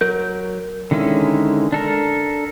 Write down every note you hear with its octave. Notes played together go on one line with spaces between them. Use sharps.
F#3 A#4 G6
D3 D#3 G#3 C#4 E4
D4 A4 A#4